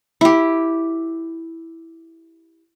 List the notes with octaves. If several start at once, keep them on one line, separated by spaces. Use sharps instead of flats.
E4 G4